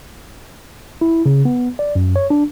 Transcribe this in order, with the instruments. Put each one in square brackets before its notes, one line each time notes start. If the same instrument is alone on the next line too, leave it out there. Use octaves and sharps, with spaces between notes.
[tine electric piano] E4
C#3
B3
D5
F#2
C#5
D4